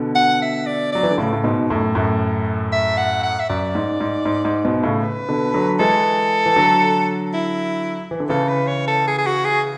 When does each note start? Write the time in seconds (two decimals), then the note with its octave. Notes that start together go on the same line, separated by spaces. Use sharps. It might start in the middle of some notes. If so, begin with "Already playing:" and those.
Already playing: B2 D3
0.15 F#5
0.42 E5
0.67 D5
0.92 F#3 D5
1.03 E3
1.11 D3
1.18 A2 C#3
1.33 A2
1.44 G#2 B2
1.70 F#2 A2
1.95 F#2 A2
2.72 E5
2.97 F#5
3.23 F#5
3.40 E5
3.49 F#2 D5
3.75 G#2
4.00 G#2
4.25 G#2
4.45 G#2
4.65 G#2 B2
4.83 A2 C#3
5.03 B4
5.29 B2 D3
5.54 D3 F#3
5.79 E3 G#3 A4
6.46 E3
6.56 D3 F#3
7.34 E4
8.11 E3
8.20 D3
8.29 C#3 E3 A4
8.49 B4
8.68 C#5
8.87 A4
9.07 G#4
9.19 G#4
9.26 F#4
9.45 G#4